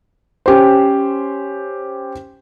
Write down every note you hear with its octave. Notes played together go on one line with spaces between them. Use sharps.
C#4 G4 C5